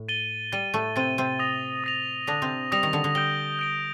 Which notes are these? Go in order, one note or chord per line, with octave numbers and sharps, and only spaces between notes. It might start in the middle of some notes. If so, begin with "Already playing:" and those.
Already playing: A2
A6 D#7 G7
G3 A6 D#7 G7
A2 A3
C3 C4 A6 D#7 G7
C3 C4
D#6 A#6 F7
D#6 A#6 F7
D3 D4 D#6 A#6 F7
C3 C4
G3 D#6 A#6 F7
D#3
D3
D3
G3 G6 D7 G7
G6 D7 G7